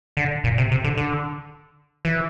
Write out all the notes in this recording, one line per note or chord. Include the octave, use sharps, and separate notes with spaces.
D3
A#2
C3
C3
D3
D3
E3